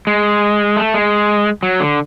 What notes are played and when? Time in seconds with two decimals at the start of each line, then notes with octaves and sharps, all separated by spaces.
0.07 G#3
0.77 A3
0.94 G#3
1.63 F#3
1.80 D3